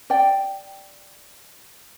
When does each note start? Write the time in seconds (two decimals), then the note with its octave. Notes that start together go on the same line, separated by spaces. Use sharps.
0.10 D5 G5